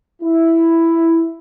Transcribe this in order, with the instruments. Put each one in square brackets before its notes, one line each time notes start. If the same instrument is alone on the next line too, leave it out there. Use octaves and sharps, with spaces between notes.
[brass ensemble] E4